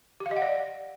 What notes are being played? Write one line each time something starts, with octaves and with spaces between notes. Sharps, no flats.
G4
F5
D#5
F#5
D5